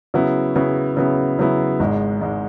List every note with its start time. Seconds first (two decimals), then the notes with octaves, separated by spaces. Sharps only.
0.14 C#3 F#3 B3 E4
0.55 C#3 F#3 B3 E4
0.97 C#3 F#3 B3 E4
1.39 C#3 F#3 B3 E4
1.80 G#1 G#2 G#3
2.21 G#1 G#2 G#3